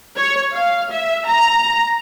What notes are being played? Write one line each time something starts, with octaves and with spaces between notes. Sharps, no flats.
C#5
F5
E5
A#5